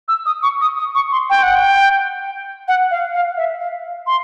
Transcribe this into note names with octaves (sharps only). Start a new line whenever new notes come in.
E6
D#6
C#6
D#6
D#6
C#6
C6
G5
F#5
G5
F#5
F5
F5
E5
F5
C6